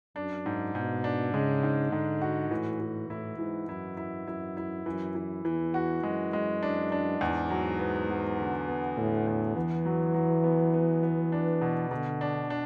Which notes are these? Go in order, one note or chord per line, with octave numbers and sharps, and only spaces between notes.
F#2 D4
G#2
G#2 B2
D4
C#3 G#3
G#2
G#2 D3
F#4
A2 E3
E3
A2 E4
G#2 E3
F#2 E4
E4
F#2 E4
E4
F#2 E3
E3
E2 E3
F#4
F#2 G#3
G#3
D4
D4
E2 G#2
F#3
B3
F#3
D3
B3
A2 D3
E2
E3 B3
F#3
F#3
B3
B3
B3
D4
B2
B2 D3
D4
D4